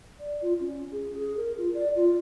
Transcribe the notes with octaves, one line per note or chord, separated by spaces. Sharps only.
D5
F4
C#4
G#4
G#4
A#4
F4
D5
F4